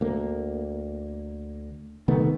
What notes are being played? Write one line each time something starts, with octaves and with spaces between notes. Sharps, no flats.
D2 A#3
C3 D#3 A3 B3